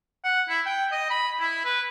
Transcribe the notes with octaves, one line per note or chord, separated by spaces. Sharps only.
F#5
E4
G5
D#5
B5
E4
B4